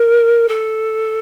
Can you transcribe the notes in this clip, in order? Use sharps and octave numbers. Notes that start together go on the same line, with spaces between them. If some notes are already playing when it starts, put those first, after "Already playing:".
Already playing: A#4
A4